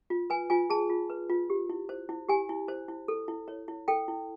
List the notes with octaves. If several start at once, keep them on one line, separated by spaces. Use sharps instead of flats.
F4
B4 G#5
F4 G#5
G#4 A5
F4
B4
F4
G4
E4
C5
E4
G4 G#5
E4
C5
E4
A4
E4
C#5
E4
A4 G5
E4